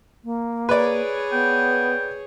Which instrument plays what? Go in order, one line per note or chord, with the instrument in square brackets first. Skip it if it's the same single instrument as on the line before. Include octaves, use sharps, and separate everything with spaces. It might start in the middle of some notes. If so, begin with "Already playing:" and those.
[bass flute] A#3
[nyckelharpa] G#4 C#5 [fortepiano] B4 D5
[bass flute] B3 [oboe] G5